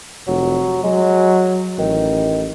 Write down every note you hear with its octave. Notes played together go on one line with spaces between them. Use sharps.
F1 F#3
F#3 G#3
A1 D#3